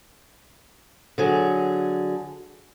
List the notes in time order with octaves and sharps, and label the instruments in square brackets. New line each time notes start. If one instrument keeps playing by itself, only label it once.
[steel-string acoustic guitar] D3 F#3 G#4